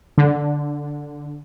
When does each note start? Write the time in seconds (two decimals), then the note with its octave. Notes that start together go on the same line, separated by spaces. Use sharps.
0.18 D3